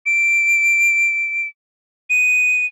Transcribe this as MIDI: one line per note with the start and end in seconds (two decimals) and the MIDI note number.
0.06 1.48 98
2.10 2.66 99